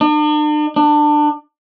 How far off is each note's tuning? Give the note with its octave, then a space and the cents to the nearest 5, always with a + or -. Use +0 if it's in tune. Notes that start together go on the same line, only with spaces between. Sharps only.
D4 +45
D4 +25